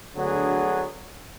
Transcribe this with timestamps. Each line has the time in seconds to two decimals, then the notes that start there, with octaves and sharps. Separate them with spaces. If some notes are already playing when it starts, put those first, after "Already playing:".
0.17 D2 D3 F#3 B3 G#4